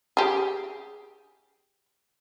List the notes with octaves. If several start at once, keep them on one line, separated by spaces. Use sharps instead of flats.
G4 G#4